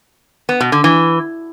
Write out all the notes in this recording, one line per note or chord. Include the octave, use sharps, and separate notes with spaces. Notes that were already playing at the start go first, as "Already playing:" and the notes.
B3
B2
D3
E3